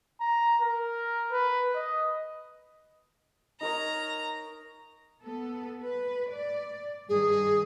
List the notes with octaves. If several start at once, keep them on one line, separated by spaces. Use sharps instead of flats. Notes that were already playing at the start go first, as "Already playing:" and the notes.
A#5
A#4
B4
D#5
D#4 A#4 C#5 A#5
B3 A4
B4
D5
G2 D#3 G#4